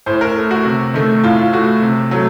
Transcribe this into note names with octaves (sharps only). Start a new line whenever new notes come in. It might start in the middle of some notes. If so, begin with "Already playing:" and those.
A2 C5
A#4
A3
F#4
C3
D#3 A3
A2 F4
F4
A3 F#4
C3
F#3 A3